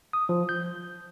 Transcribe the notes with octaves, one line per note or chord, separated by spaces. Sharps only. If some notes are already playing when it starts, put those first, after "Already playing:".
D#6
F3
G6